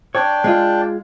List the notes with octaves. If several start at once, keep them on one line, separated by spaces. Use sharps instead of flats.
D4 C#5 D5 G5
G#3 F4